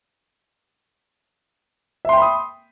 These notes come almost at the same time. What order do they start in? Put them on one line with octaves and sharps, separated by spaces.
E5 C6 G5 B5 D#6